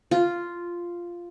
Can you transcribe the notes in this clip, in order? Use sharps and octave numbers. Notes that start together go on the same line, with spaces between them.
F4